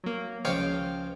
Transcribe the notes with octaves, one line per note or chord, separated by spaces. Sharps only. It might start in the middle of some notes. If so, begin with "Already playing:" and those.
F#3 A#3
C#2 F3 C#5 F5 G5